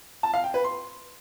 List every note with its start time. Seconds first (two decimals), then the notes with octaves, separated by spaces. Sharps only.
0.23 A5
0.34 F5
0.44 G5
0.54 B4
0.64 C6